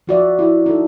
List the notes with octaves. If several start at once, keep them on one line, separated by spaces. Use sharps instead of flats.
F3 F#4 D5 E5
E4 F#4
D#4 A4